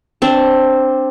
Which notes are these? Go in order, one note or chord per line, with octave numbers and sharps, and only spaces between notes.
C4 D4